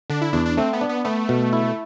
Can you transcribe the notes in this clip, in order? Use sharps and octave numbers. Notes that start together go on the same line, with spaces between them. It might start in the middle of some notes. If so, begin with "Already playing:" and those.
D3 D4
E4
E2 D4
D4
A3 C4
B3
D4
B3
A3 B3
B2
E4